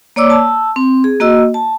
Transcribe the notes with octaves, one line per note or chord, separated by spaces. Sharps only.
A#3 C#5 D5 D6 E6
A5 E6
C4
G#4
A#3 F#4 D#5 E6
A5